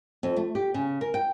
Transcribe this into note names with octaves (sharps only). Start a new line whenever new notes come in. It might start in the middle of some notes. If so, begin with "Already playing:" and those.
F2
A3
G4
C#3
A#4
G5